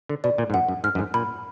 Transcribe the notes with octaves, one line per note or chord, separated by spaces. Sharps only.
D3
B2 D5
A#2
G#2
F#2 F#5
F#2
G#2 F6
F#2
G#2
A#2 B5